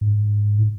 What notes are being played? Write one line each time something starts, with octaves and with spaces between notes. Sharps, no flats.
G#2
A2